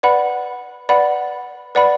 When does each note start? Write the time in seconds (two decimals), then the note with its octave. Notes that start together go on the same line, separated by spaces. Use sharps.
0.03 B4 D5 F#5 B5
0.89 B4 D5 F#5 B5
1.75 B4 D5 F#5 B5